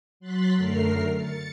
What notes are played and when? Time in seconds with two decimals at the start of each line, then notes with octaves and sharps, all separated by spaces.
0.20 F#3 C6 F#6 A6 B6
0.56 F#2 D3 A3 A#4 F6 C7
1.16 A6 C#7